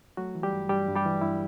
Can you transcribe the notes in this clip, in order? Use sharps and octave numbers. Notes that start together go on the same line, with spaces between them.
F#3 A3 F#4
E3
G3 G4
G2
G2 G3 G4
G2
G3 G4
E3
G2 E4